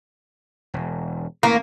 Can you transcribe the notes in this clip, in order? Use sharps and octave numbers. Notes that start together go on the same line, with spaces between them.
E1
A1 E3 A#3